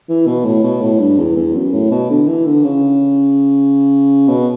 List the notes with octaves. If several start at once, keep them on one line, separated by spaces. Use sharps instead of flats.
E3
B2
A2
B2
A2
G2
E2
E2
F#2
A2
B2
D3
E3
D3
C#3
B2